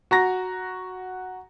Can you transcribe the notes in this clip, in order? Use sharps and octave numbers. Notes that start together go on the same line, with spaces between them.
F#4 A#5 A#6